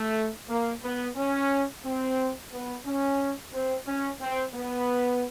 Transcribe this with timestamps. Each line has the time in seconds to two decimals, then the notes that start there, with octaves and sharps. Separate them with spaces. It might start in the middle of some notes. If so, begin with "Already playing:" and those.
Already playing: A3
0.49 A#3
0.83 B3
1.16 C#4
1.84 C4
2.52 B3
2.85 C#4
3.53 C4
3.86 C#4
4.20 C4
4.54 B3